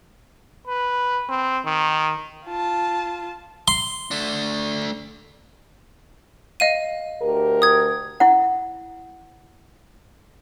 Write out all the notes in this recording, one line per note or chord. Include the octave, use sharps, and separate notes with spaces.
B4
C4
D#3
F4 A5
C6
A3 D4
D#5 F5 D#7
D2 G4 A#4
D#6 G#6
E4 F#5